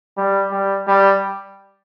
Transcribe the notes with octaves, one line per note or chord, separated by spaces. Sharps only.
G3
G3
G3